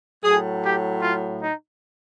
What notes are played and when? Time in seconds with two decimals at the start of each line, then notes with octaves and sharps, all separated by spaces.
0.23 A2 F#3 G#4
0.63 G4
1.01 F4
1.40 D#4